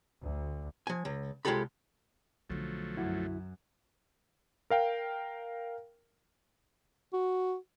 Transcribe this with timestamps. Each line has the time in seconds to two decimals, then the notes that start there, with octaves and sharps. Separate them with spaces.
0.22 D2
0.87 F3 G#5
1.05 C#2
1.45 C2 G#3 F4 G4 A4 B5
2.50 B1 D3 F3 F#3 A3
2.97 F#2 E4 F#4
4.70 A#4 F5 G5
7.13 F#4